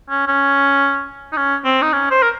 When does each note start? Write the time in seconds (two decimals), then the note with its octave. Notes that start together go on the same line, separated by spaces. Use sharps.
0.10 C#4
0.27 C#4
1.32 D#4
1.37 C#4
1.65 C4
1.82 D#4
1.93 C#4
2.11 C5
2.23 A#4